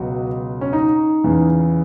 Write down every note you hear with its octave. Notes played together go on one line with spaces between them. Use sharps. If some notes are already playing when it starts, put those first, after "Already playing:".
Already playing: C#2 B2 F#3 F#4
C#4
D#4
E2 C#3 E3